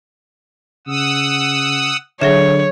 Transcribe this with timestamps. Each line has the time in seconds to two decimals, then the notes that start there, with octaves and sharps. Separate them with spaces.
0.87 C#3 F#5 D#6 E6
2.22 D3 F#3 G#4 C#5 E5